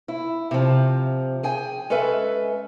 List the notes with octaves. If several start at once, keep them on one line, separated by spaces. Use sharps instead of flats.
E4
C3 F3
G#4 G5 G#5
G#3 C#4 A4 B4 E5